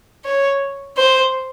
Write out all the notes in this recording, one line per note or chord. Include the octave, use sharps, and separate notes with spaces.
C#5
C5